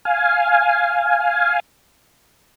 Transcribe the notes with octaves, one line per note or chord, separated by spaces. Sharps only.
F5 G#5